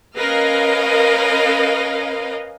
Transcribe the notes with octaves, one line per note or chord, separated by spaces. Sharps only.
C#4 A#4 B4 D#5 F5